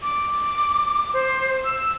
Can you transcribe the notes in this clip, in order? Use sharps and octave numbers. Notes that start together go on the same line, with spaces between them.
D6
C5
E6